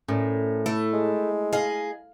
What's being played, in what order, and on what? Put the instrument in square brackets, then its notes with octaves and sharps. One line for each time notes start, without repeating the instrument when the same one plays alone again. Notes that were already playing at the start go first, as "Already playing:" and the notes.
[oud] A2 [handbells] C#4 A#4 D5
[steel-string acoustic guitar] A3 [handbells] E4
[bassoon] G#3
[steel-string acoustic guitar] G#4 D#5 [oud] F5